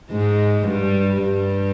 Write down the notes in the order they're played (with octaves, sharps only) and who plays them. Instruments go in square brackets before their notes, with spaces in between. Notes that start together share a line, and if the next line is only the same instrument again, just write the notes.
[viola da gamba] G#2 G#3
G2 G3
G2 G3